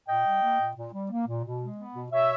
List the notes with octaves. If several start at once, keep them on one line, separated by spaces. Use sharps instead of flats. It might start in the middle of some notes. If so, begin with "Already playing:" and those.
A#2 D#5 G5
G3
A#3
A#2
A#2
G3
A#3
A#2
B2
G#3
B3
B2
B2 C#5 E5